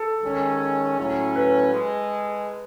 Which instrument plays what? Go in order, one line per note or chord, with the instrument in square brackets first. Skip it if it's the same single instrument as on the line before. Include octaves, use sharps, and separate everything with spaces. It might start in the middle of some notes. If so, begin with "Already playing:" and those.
Already playing: [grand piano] A4
[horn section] D#3 G#3 C#4
A2 F#3 C#4
[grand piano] B4
[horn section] G#3